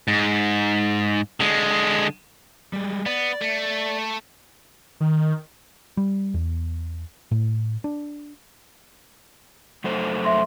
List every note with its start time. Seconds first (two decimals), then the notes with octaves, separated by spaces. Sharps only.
0.08 G#2
1.40 D3 G#3
2.73 G3 G#3
3.06 B3 D5
3.42 A3
5.00 D#3
5.97 G3
6.34 E2
7.31 A2
7.84 D4
9.84 F#2 A3 C5
10.24 E5 C6